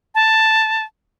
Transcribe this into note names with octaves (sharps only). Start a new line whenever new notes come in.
A5